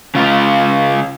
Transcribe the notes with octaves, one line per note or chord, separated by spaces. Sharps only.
C#3 F4